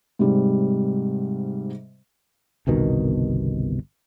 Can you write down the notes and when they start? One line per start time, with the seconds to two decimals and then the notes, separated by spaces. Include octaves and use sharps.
0.19 G#2 C3 G3
2.67 G1 C2 B2 D#3